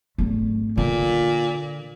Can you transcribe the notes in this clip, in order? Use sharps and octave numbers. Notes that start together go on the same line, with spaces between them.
G#1 A3
A#2 D3